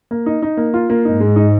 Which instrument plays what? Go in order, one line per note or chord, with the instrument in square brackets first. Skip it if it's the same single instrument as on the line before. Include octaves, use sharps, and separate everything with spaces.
[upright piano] A#3
D#4
D#4
A#3
F4
A#3
[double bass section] G#2 [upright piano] D#4
[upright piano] G#3
D#4